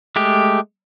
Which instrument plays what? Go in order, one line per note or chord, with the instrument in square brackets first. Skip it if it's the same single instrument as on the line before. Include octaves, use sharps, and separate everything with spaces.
[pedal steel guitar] G#3 A3 G4